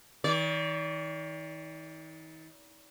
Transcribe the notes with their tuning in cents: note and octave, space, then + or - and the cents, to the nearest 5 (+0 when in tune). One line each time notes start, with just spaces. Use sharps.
D#3 +40 D5 -35